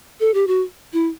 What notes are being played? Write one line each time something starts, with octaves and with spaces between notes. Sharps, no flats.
A4
G4
F#4
E4